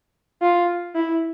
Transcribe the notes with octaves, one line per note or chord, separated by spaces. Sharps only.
F4
E4